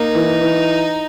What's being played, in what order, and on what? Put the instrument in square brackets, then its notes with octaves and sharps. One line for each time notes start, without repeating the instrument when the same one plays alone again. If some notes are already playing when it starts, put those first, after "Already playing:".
Already playing: [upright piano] A#3 [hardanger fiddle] D#4
[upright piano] E3
E3